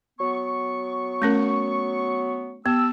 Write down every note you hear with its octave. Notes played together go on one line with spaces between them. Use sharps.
F#3 B3 C#6
A3 C#4 A#4
B3 G4 A5 E6